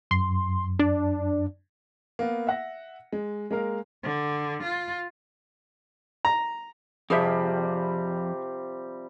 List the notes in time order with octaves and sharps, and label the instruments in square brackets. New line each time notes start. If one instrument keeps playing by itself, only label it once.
[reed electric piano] F#2 [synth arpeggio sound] C6
[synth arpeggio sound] D4
[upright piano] A#3 B3
E5 F#5 A#6
G#3
G#3 A#3 A#4 F5
[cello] D3
F4
[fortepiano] A#5
[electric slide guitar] F2 [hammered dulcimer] C3 F3 G3 [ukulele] G#4 C5 E5